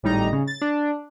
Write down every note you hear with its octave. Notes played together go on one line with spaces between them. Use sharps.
G#1 A2 G3 D#4 A#5
C#3
A6
D4